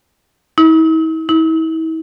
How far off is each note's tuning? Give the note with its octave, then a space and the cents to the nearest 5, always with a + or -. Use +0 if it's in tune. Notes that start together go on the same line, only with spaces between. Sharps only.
E4 -45
E4 -40